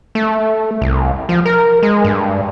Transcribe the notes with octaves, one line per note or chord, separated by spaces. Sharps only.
A3
C2
F3
A#4
G#3
G2